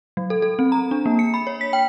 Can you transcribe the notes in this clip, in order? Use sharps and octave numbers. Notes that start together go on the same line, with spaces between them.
F#3
A4
A4
C4
A#5
D4
A#3
C#7
B5
C#5
B6
G5